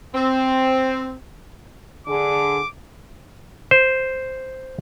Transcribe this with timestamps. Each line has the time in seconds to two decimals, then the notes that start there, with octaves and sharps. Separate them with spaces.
0.15 C4
2.07 D3 G#4 D6
3.71 C5